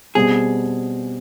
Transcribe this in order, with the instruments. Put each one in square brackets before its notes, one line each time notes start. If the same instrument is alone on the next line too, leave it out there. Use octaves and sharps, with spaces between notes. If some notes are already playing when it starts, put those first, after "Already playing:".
[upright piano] B2 G3 C4 [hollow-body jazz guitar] G#4